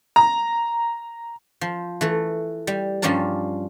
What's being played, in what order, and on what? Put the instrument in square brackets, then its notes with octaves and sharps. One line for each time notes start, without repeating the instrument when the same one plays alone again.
[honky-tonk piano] A#5
[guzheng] F3
E3 A3 A4
G3
G2 F3 G3 C#4 A#4 A5